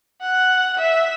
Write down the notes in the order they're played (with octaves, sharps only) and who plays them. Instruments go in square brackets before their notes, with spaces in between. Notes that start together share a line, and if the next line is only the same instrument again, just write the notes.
[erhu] F#5
E5